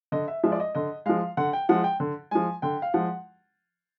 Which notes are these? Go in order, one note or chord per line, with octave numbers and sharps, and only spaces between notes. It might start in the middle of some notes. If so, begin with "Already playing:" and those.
D3 D#5
E5
F3 G#3 E5
D5
D#5
D3 D#5
F3 G#3 F5
D3 F#5
G5
F3 G#3 F#5
G5
D3
F3 G#3 G#5
D3 G5
F5
F3 G#3 F#5